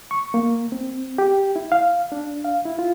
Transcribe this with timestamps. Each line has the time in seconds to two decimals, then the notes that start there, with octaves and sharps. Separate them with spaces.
0.11 C#6
0.34 A#3
0.72 C4
1.18 G4
1.56 E4
1.72 F5
2.12 D4
2.44 F5
2.65 E4
2.79 F4